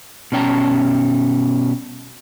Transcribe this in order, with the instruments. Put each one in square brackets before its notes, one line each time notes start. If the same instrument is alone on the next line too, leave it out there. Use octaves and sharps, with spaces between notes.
[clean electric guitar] B2 G3 C#4 G5 A5 A#5